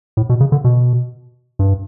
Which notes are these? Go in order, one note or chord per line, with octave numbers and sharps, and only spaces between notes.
A2
B2
C#3
D3
B2
G2